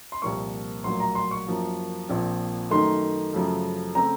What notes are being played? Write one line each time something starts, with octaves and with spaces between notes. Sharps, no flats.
C6
C2 A#2 F3 A#3 C#6
A#1 A2 F#3 A#3 C6
A#5
C6
C#6
F#2 F3 A#3
A#1 A#2 F3 C4
F#2 D#3 A3 C6
F#2 C#3 F3 A3
C#3 A3 C4 A#5